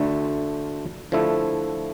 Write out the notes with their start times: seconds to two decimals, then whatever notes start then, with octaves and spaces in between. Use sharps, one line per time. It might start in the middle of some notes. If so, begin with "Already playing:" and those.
Already playing: D2 D3 A3
1.12 D3 F3 A3 E4